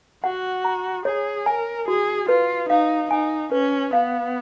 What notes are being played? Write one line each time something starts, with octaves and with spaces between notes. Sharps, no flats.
F#4 F#5
A#5
G#4 C#5
A#4 G#5
F#4 G#4
F4 B4
D#4 F5
D#4 G#5
C#4 B4
B3 F5